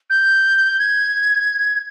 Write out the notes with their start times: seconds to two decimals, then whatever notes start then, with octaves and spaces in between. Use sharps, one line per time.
0.10 G6
0.79 G#6